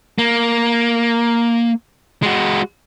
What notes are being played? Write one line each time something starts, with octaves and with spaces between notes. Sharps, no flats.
A#3
G#3 F#4